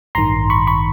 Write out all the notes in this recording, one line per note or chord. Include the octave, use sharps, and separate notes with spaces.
A1 G2 D#3 A#5 C6
B5 C#6
B5 C#6